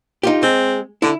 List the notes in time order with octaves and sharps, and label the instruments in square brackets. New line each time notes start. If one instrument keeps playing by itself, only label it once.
[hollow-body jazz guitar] D#4 F4 G4
[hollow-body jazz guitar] G#3 [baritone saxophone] C4
[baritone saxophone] D3 [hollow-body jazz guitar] E4